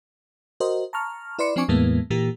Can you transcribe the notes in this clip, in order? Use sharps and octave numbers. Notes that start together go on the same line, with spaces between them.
F#4 A#4 C5 D#5
A5 A#5 C#6 F6
E4 B4 D5 C6 C#7
F3 C4 D4 G#5 C#6 D6
E2 A2 E3 G#3 A#3 B3
A#2 E3 A#3 G4